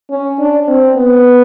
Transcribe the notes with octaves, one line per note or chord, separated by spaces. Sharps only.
C#4
D4
C4
B3